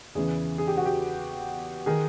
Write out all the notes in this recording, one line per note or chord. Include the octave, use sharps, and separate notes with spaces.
E2 C#3 E3 G#4
G#4
G4
F#4
G4
D#3 G#4